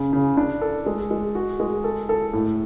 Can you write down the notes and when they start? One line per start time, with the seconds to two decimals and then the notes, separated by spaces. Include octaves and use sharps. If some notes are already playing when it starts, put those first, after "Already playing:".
Already playing: C#3
0.13 C#3
0.37 D4
0.61 A4
0.86 G#3
1.11 G#3
1.35 F#4
1.60 G#3
1.84 A4
2.09 A4
2.33 A2